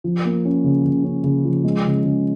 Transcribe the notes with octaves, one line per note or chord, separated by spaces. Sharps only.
F3
A#3
C#4
C#3
C#3
C#4
C#3
F3
G#3
C#3
C#3